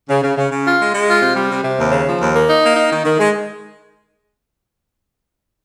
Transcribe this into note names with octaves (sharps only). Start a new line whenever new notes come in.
C#3
C#3
C#3
C#3
F4
G#3
G#3
F4
C3
G3
C3
C3
D#2
C#3
F3
D#2
A#3
D#4
A#3
D#4
D#3
D#3
G#3